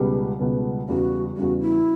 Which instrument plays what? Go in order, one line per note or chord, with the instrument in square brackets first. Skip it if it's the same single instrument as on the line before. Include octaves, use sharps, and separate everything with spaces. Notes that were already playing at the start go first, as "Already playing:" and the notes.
Already playing: [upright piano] C#2 B2 G3 B3 [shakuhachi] G4
[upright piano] C#2 B2 G3 B3
[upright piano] E2 C#3 G3 [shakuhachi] F#4
[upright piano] E2 C#3 G3 [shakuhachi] F#4
[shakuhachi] E4